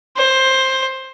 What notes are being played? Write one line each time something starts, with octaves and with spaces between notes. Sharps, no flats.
C5